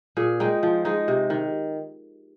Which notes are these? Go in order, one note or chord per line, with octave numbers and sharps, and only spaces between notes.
A#2 G#4
G#3 D#4 G5
F3
G#3 D#4
C3
D#3